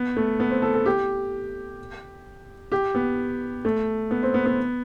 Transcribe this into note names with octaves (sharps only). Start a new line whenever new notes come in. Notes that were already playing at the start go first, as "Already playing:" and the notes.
Already playing: B3
A3
B3
C4
A4
A4
G4
G4
B3
A3
B3
C4
B3
B3